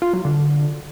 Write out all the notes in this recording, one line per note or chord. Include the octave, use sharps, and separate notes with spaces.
F4
F#3
D3